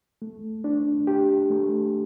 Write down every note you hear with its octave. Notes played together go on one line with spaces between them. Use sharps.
A3
D4
G4
A3